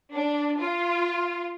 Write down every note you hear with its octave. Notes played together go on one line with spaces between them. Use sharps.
D4
F4